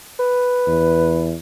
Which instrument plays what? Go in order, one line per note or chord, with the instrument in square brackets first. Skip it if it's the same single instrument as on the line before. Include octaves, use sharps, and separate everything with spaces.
[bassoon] B4
[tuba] E2